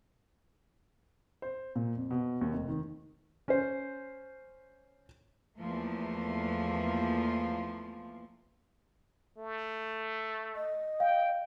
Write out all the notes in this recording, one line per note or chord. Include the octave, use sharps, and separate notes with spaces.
C5
A#2
F2
B2
D#2
F1
D#3
C#4 C5
E2 F3 A3 A#3
A3
D#5
F5 G5